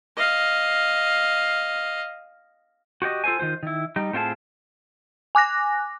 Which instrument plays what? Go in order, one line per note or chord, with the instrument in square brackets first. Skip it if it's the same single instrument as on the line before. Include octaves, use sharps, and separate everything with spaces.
[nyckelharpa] D#5 F5
[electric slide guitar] F#4 G4 C#5 D#5
F4 A4 C5 G#5
D#3 G3 F4 C5
D#3 E4
G3 D#4
A2 C4 F4 G#4 A5
[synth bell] G#5 D6 F#6 A#6